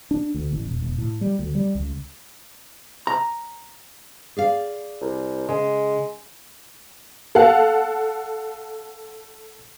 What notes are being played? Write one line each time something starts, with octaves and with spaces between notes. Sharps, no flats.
D4
D2
A1
E1
E1
A2
G3
D2
G3
C#2
A#5
G#4 D5 F5
C2
C#3 G#3
A4 F5 F#5